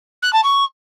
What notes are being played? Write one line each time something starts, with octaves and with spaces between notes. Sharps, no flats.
F#6
A5
C#6